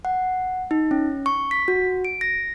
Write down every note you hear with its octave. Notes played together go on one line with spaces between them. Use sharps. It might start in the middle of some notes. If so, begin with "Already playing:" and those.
F#5
D#4
C#4
C#6
B6
F#4
D7
A#6